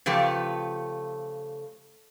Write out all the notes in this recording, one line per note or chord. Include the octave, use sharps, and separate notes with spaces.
C#3 F3 A3 G4 B4